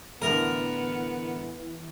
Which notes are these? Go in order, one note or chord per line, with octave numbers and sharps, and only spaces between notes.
A2 D3 E3 B3 A#4